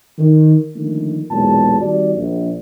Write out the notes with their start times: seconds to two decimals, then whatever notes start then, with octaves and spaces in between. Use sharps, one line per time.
0.19 D#3
0.75 D3 D#3 F3 A3 A#3
1.31 B1 E2 A#2 G#3 A5
1.81 D#3 G3 C4 F#4 D5
2.16 A#1